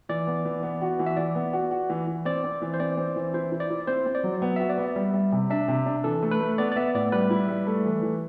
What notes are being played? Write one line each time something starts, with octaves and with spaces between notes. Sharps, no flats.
E3 D5
B3
E3
B3
F#4
E3
E5
E3 D5
B3
F#4
F#4
E3
E3
C4 D5
C4
E3
C5
C4 D5
C4
E3
E4 C5
E4
D5
E4
C4 C5
C4
D5
F#3
B3
F#4 E5
D5
B3
E5
G3
G3
C3
D4 E5
C3
D4
E3 A4
A3
B4
A3
B3 D5
D5
B3 E5
A2 D5
G3 B4
E4
G3
A3
E3
E3